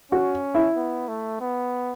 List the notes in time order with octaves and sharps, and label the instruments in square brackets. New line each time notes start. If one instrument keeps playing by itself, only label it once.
[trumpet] C#4 [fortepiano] F#4
[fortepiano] E4
[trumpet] B3
A3
B3